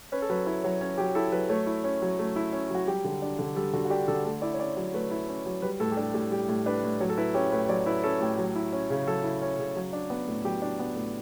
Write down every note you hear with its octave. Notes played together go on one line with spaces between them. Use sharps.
C#4 B4
A4
F#3 B4
E4 C#5
F#3 C#5
C#4 C#5
F#3 G4
E4 A4
F#3 B4
A3 C#5
E4
C#4
F#3
A3
E4
C#4
F#3 F#4
G3 G4
D3
D4
D3
G3 A4
D3 F#4
F#4
D4 G4
D3 A4
A3 A4
E4 D5
C#5
C#4 D5
F#3 C#5
A3 B4
E4
C#4
F#3
G3 B4
A2 A4
G4
D4 A4
A2 G4
G3 G4
A2
D4 B4
A2
F#3 C#5
A4
E4 B4
C#4 G4
A2 B4
F#3 D5
E4 B4
C#4 A4
A2 G4
F#3
E4
C#4
C#3
F#3 A4
E4
C#4
C#3
F#3
D4
B3
A2
F#3 G4
D4
B3
A2